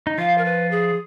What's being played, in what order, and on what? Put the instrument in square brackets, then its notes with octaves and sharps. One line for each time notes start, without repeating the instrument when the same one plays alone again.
[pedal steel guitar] D#4
[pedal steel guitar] F3 F4 [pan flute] F5
[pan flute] A#4
B4
G#4